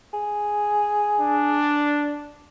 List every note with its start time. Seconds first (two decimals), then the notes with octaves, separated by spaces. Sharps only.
0.13 G#4
1.19 D4